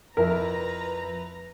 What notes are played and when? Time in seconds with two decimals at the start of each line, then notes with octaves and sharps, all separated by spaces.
0.17 F2 E4 A#4 B4 A#5